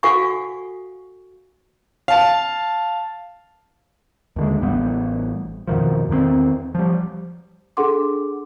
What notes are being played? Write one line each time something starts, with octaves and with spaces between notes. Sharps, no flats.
F#4 A4 F5 F#5 G#5 C#6
F5 A5
D#2 D3 G#3
A1 G3 B3
F2 B2 D#3 F3
E2 D#3 A3 C4
F3 G3
D4 G#4 A4 F#5 C6 D6